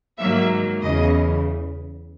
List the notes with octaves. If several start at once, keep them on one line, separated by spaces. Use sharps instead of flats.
G#2 D#3 F#3 A#3 E5
E2 C#3 E3 D#5